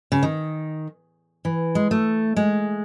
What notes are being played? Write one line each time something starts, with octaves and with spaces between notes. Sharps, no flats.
C#3
D#3
E3
G#3
A3
G#3